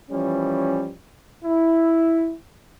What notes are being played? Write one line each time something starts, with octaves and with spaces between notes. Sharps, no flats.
E3 F3 G3 C#4
E4